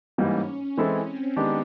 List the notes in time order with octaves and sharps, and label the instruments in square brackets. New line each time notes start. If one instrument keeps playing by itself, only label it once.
[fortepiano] G#2 E3 G3 A#3 D#4 [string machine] C#4
[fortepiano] E3 G#3 C4 E4 A4 [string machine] C#4
[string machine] C4
[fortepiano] D#3 G#3 B3 D4 G4